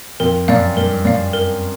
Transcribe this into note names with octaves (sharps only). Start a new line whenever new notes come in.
F2 A#4
F#2 D5 F5
G2 A#4
F#2 D5 F5
A#4